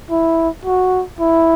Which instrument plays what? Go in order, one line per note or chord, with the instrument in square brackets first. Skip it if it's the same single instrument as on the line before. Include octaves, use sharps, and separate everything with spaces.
[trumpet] E4
F#4
E4